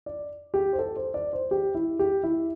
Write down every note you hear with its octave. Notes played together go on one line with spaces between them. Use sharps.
D5
G4
C5
A4
C5
D5
C5
G4
E4
G4
E4